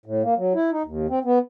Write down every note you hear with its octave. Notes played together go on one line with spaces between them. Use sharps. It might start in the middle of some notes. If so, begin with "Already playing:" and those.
A2
A#3
F#3
E4
D#4
D#2
C4
B3